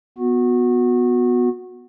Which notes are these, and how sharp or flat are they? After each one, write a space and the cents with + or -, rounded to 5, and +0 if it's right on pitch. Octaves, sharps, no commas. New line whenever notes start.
B3 +0 F#4 -25